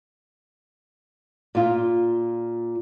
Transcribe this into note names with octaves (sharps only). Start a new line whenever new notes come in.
A#2 F4